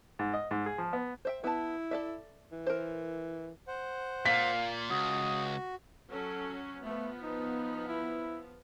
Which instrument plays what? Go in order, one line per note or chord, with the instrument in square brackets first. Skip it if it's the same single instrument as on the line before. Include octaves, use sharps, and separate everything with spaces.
[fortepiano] G#2
D#5
G#2
G#4
F3
B3
[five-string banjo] C5 E5 G5
[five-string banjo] B3 A5 [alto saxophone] E4
[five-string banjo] A4 D5 E5
[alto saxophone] E3
[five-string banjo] A#4 C5
[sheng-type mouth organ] C5 F#5
[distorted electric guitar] A#2 [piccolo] F5 [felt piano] B6
[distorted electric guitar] C#2 [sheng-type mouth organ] F#4 [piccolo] D#6
[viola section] F#3 C#4 [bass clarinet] A4
[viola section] F3 B3 [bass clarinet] A3
[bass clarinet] D#4
E4